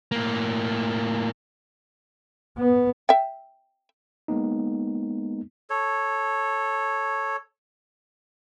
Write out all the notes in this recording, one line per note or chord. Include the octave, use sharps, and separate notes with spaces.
A2 A#3
B3
E5 G5
G#3 A#3 B3 D#4
A4 C#5